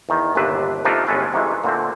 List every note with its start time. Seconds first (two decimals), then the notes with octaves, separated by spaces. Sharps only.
0.09 E2 D#3
0.35 G1 D#2 C3 D4 B4 E5
0.85 C3 F3 A3 D4 D#4 F4
1.07 G1 G#3 B3 C#4 A4 B4
1.33 F2 C3 D#3 E3 G#3
1.64 A#2 D3 A3 C4